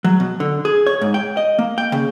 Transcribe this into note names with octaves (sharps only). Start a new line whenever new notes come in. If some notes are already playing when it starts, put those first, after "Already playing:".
F#3
B2
D3
G#4
C#5
G#2
G5
D#5
A#3
G5
C#3